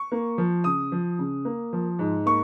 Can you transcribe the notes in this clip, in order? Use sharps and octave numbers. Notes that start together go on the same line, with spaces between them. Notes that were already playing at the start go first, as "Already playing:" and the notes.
Already playing: C#6
A#3
F3
C#3 D#6
F3
C#3
A#3
F3
G#2
A#3 C#6